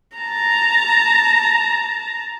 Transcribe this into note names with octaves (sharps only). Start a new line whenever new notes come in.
A5 A#5